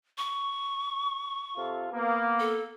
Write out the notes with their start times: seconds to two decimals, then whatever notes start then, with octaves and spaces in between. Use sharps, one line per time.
0.18 C#6
1.56 C3 F4 A4
1.92 A#3 B3
2.40 A4